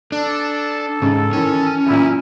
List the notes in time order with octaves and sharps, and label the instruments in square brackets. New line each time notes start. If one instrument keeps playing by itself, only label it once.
[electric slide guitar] D4 [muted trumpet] A4
[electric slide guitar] G#2 [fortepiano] C#3
[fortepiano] D#3 E3 [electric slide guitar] C#4
[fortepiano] F#2 A#2 [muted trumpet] E4